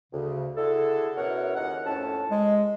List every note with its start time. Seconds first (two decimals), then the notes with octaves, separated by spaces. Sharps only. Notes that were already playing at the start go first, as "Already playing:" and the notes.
0.12 D2 C#3
0.56 D3 E4 F#4 G#4 A4
1.16 F#2 B2 E4 A#4 C#5 F#5
1.55 D#2 C#3 D#4 A#4 F#5
1.85 F2 A2 C#4 A4 A5
2.29 G#3